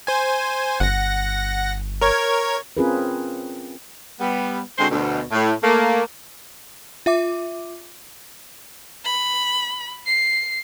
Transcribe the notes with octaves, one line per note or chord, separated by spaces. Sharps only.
C5 G#5
G1 F#5 A#6
A#4 C#5 G#6
C4 C#4 F4 G#4 A#4 B4
G3 B3
D3 G#3 C4 F#4 C5
D2 B2
A2
A3 A#3
F4 E5 D6
B5
C7